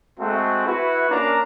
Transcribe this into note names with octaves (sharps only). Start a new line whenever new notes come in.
G#3 A3 C4 F#4
E4 F#4 B4
A#3 C#4 D4 A#4 F5 A#5